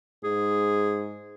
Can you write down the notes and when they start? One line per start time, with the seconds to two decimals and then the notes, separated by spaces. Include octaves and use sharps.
0.24 G#2 G#4